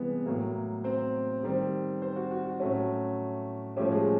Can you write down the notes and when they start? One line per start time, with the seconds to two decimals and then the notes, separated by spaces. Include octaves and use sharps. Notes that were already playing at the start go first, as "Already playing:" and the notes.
Already playing: C3 E3 G3 G#3 B3 B4
0.26 A2 F#3 A#3
0.84 C4 C5
1.43 D#3 G3 C4
2.02 C4 C5
2.16 F#4
2.31 F#4
2.45 F#4
2.60 A2 F#3 A3 C#4
3.77 A2 F3 G3 A3 C#4 G4
3.91 G#3 G#4